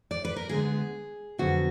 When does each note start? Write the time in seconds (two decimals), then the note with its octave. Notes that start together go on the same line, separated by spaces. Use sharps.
0.11 D5
0.25 B4
0.36 A#4
0.49 D2 D3 G#3 B3 G#4
1.38 F2 D3 F#3 B3 F#4